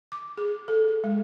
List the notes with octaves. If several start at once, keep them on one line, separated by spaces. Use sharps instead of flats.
D6
G#4
A4
A4
G#3